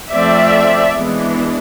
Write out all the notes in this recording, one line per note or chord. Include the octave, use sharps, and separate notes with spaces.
F3 A3 C4 D5 E5
E3 G#3 B3 D4